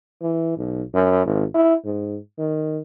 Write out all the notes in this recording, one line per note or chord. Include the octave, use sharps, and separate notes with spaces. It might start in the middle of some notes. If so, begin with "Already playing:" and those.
E3
B1
F#2
G#1
E4
G#2
D#3